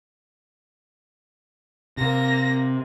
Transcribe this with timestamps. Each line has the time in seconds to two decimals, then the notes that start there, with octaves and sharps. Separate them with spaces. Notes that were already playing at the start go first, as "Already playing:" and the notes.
1.97 C3 A#3 A#6